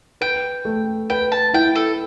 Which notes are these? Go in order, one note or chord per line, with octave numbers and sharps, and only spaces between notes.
B4 G5
A3
B4 G5
A5
E4 G5
A4